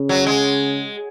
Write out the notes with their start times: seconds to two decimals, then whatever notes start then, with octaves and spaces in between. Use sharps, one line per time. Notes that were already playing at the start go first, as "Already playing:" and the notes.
Already playing: C#3
0.09 F#3
0.26 G#3